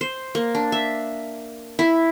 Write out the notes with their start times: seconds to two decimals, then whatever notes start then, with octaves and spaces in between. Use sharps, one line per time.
0.01 C5
0.35 A#3
0.55 D4
0.72 E5
1.79 E4